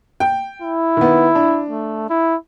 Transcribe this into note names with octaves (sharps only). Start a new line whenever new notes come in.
G5
E4
D#3 B3
D4
A3
E4